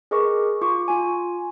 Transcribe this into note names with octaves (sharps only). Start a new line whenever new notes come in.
G#4 A#4 B4 D#5 C#6 D6
F4 C#6 D6
F4 G#5